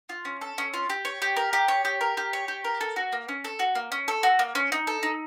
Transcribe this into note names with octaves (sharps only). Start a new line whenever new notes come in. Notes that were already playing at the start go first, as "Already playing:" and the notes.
F4
C#4
A4
C#4
F4
G4
C#5
G4
A#4
G4
C#5
G4
A#4
G4
C#5
G4
A#4
A4
F#4
A#3
C#4
A4
F#4
A#3
C#4
A4
F#4
A#3
C#4
D#4
A4
D#4